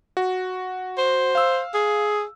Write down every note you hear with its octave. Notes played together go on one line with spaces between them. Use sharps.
F#4
C5
F5 E6
G#4